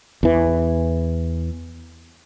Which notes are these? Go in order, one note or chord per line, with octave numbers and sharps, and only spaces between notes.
E2 E3